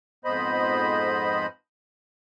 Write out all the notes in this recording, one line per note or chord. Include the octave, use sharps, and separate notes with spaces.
F2 G#2 B3 C5 D#5 B5